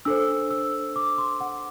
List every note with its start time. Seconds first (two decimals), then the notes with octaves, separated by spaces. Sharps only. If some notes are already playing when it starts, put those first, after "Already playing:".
0.05 D4 A4 C5 E6
0.51 E6
0.96 D6
1.18 C6
1.40 F#5